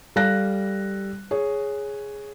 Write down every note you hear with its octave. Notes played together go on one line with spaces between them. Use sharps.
G3 A4 F5 F#6 A#6
G#4 C#5